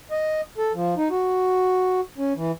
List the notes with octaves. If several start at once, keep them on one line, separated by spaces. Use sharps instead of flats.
D#5
A4
F3
D#4
F#4
C#4
E3